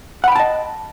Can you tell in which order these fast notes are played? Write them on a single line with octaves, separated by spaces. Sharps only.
F#5 B5 G5 A5 D#5